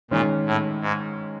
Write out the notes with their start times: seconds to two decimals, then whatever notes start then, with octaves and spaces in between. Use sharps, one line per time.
0.10 A#2 D#3 G#3 C#4
0.46 A2
0.81 G#2